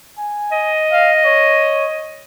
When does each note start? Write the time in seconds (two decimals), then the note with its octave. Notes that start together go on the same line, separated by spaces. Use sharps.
0.18 G#5
0.52 D#5
0.92 F5
1.25 C#5